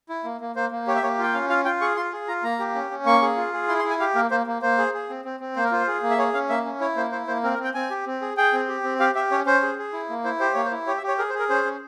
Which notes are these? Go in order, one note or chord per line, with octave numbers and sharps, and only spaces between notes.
E4
A#3
A#3
A#3 C5
A#3
G4 C#5
E5
A#3 C#5
F4 G5
C#4 F5
F4 F5
F4 G5
G#4 C#6
F4 C6
G#4
F4 A#5
A#3 A#5
G4
C#4
C#4
A#3 C#6
G#4
F4
G#4
E4 C6
C6
E4
G#5
G4 F5
A#3 A#4
A#3 C5
A#3
A#3 C5
G#4
G#4
C4
C4
C4
A#3 C5
A#4
F4 C5
G#4
A#3
E5
G#4 C#5
C#4 F5
A#3 E5
C#4
E4 C#5
A#3 C5
E4 C5
A#3 C5
C4 A#4
A#4
C4
G5
C4 G#5
G4
C4
G#4
G#4 G5
C4
G4
C4
G4 F5
G4 E5
C#4 C#5
C#4 C5
G#4
G#4
E4
A#3
E4 C5
G4 C5
A#3 C#5
C5
E4
G4 C#5
E5
G4
C#5
G#4 A#4
C5
G#4 A#4
C#4 C5
C#4